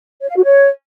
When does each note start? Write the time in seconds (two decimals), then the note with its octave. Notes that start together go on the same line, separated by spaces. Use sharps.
0.22 C#5
0.29 F5
0.37 F#4
0.44 C#5